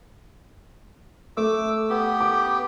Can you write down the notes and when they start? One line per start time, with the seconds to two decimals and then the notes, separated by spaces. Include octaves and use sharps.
1.37 A3 D6 E6
1.90 B3 G4
2.21 D6